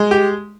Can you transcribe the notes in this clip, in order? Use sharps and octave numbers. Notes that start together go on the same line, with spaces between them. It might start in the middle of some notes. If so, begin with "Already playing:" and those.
Already playing: G#3
G4